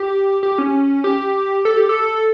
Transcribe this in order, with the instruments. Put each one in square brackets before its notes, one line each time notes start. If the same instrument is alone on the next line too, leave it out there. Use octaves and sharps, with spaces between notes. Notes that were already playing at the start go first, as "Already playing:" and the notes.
Already playing: [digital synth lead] G4
G4
C#4
G4
A4
G4
A4